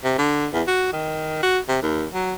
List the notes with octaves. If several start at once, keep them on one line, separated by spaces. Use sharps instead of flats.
C3
D3
E2
F#4
D#3
F#4
C3
D#2
F#3